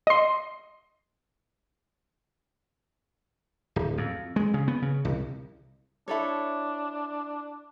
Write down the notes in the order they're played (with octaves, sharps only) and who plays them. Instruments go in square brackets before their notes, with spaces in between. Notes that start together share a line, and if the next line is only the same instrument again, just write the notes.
[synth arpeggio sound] D#5 C6
[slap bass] D1
F2
G#3
C#3
B3
C#3
C2
[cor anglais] D4 [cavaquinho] E4 A4 C#5